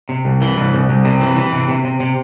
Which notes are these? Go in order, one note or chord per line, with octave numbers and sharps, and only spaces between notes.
C3
C2
E3
C2
C2
C2
C3
E3
E3
C3
C3
C3
C3